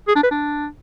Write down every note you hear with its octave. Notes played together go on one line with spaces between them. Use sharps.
G#4
D4
B4
D4